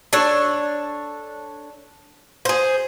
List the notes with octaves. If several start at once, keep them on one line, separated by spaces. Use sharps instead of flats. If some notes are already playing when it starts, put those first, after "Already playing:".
D4 A4 C#5
G#4 C5